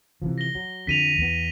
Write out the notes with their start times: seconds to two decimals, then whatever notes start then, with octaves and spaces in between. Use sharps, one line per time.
0.22 C3 E3 F3
0.38 A#6 G7
0.55 F#3
0.87 F2 D3 B6 D#7 F7
1.18 E2 B3